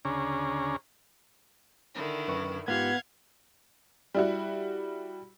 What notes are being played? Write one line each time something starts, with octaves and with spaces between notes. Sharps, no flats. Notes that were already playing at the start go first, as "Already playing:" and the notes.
D2 C#3 C#4 D4 G#4 A#5
D3 D#3 E4
F#2 B4 C#6
G#2 B3 F4 G4 F5 F#5 G6 G#6
G3 E4 F#4